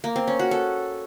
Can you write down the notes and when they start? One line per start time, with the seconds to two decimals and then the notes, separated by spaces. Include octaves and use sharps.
0.04 A#3
0.16 C4
0.28 C#4
0.39 F#4
0.51 A4